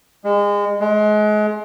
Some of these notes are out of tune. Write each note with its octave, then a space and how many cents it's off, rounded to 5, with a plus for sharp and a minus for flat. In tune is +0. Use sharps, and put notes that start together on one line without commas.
G#3 -30
G#3 +30